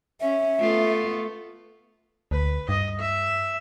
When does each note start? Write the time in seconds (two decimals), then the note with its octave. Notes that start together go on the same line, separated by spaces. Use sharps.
0.21 C#4 E5
0.60 A3 B3 F4
2.31 D2 B4
2.69 G2 D#5
2.99 E5